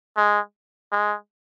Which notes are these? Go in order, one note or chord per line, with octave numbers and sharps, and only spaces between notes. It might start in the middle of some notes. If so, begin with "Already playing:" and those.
G#3
G#3